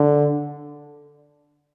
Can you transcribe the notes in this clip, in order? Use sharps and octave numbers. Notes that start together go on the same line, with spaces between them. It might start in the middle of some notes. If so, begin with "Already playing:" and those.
Already playing: D3